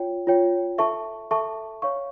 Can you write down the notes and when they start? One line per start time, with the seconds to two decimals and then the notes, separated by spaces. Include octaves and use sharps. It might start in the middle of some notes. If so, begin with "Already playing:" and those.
Already playing: F4 C#5 G5
0.27 F4 C#5 G5
0.78 A4 E5 A5 C#6
1.31 A4 E5 A5 C#6
1.82 C#5 F5 C#6